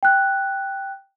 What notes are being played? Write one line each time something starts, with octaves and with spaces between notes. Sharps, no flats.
G5 F#6